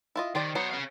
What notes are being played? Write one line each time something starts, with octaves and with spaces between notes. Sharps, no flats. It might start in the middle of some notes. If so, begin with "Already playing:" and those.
E4 F4 D#5
D#3 G4 C5 D5
F#3 B3 C5 C#5
C#4 F5